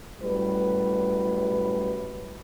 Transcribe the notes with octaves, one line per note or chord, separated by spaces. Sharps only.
F#2 A2 G3 B4